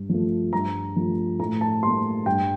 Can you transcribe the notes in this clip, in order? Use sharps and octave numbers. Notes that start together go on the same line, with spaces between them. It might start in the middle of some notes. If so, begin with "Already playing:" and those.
Already playing: G2
F3 A3
G2 A#5
F3 A3
A2 A#5
A5
G3 A#3 C6
G2 G5